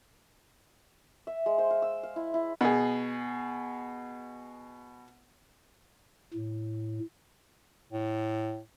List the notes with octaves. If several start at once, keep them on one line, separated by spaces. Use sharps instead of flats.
E5
G#3
C5
F5
E6
F5
E4
E4
B2 G#4
A2
A2